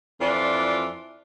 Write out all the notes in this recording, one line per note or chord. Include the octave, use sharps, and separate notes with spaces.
F2 E3 D4 F4 D5 E5